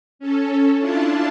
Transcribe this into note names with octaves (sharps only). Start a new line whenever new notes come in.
C#4 A4
D4 E4 F4 A5